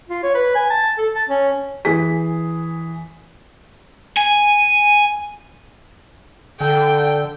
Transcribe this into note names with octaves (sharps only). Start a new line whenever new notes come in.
F4
C#5
B4
G#5
A5
A4
A5
C#4
E3 G#4 B6
G#5
D3 A4 G5